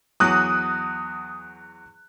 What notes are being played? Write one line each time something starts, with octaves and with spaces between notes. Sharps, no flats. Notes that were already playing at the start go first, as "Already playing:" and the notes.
E2 F#3 D6 D#6 F#6